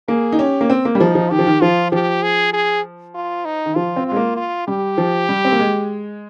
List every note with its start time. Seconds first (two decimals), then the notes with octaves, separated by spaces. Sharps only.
0.08 A#3 G#4
0.32 D#4
0.39 C#4 G4
0.61 A#3
0.70 C4
0.85 A#3
0.95 G3
1.00 F3 D#4
1.15 F3
1.31 D#3 G4
1.39 F3
1.47 D#3
1.61 F3 F4
1.92 F3 G4
2.23 G#4
2.53 G#4
3.15 F4
3.45 D#4
3.66 D#3
3.75 F3 F4
3.96 C4
4.07 F4
4.12 G#3
4.16 A#3
4.37 F4
4.68 G3 G4
4.98 F3
5.29 G3
5.45 C4
5.52 A#3
5.59 G#3